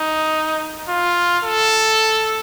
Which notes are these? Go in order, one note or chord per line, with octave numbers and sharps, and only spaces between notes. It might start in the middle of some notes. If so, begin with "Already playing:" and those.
Already playing: D#4
F4
A4